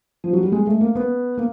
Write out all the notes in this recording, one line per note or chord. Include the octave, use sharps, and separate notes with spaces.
F3
F#3
G3
G#3
A3
A#3
B3
A#3